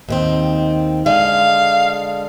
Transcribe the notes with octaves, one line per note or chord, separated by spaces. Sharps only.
D#2 D#3 C4
D3 G#3 F5